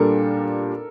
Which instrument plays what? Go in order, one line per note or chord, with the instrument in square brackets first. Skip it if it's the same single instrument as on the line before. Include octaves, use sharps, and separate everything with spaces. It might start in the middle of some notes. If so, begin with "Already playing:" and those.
Already playing: [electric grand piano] A#2 G3 D4 [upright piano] A4 A#4